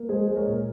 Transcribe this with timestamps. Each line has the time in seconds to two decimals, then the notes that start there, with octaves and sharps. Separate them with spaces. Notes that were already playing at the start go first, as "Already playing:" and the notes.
Already playing: A#3
0.09 G#3 G#4 C5
0.28 G#3
0.36 A#4 C#5
0.46 A#2